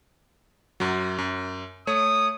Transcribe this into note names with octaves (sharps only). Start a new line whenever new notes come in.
F#2 F#3
F#2
A3 C#5 D#6